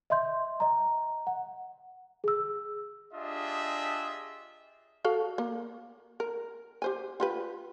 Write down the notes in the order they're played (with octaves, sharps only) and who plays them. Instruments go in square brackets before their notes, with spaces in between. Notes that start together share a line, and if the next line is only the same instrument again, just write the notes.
[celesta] D#5 E5 C6 G6
D#5 A#5
F#5
G#4 E6
[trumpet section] D4 F4 G4 G#4 D#5 E5
[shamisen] F#4 A4 F5
A#3
A#4
G4 C5 G#5
F4 G4 B4